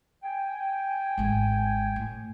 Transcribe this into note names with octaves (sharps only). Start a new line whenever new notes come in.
G5 G#5
G#1 G#3
A2